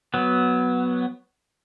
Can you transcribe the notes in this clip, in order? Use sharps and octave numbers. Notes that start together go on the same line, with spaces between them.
F#3 B3